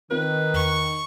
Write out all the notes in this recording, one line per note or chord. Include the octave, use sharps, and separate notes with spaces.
D#3 C4 F4 A#4 B4
E2 C#6